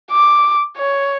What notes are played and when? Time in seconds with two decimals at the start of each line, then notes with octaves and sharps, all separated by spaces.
0.11 D6
0.77 C#5